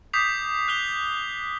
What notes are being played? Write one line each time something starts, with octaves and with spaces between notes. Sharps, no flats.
D6 D#6 G6 B6 C7 F7
F#6 F7 G7